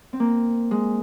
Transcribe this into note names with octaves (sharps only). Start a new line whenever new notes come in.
C4
A#3
G#3